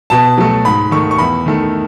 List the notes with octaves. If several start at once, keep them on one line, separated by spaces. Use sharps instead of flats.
B2 A5
F#3 A3
G#2 B5
D#3 A3 C#6
C#6
E2 B5
D#3 A3